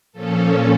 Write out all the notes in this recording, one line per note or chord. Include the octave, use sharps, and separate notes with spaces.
A#2 F3 C#4 A4